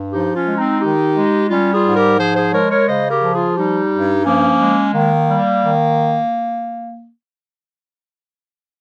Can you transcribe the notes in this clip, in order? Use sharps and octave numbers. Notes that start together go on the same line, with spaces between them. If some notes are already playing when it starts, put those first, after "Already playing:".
Already playing: G2
F3 D#4 G4
C#4 F4
G#3
C4 D#4
D#3 D#4 G4
G#3
G3 C#4 F4
F4 G#4
G#2
G4 A#4
F3 G#4 C5
G#4 C5
G#3 A#4 C#5
A#4 C#5
C#3 C5 D#5
G4 A#4
F3
F4 G#4
G3 D#4 G4
G2
F3 A#3 C#4
G#3
D#3 A#3
G3
D#3